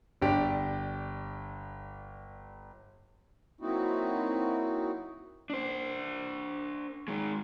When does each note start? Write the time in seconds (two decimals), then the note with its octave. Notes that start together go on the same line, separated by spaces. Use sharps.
0.22 G1 D4 G4 D7
3.61 F#3 A#3 C4 D#4 E4 F#4
5.50 D4 C5
7.08 D#3 G#3